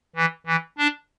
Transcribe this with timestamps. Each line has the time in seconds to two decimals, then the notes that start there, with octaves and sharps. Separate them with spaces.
0.16 E3
0.47 E3
0.78 D4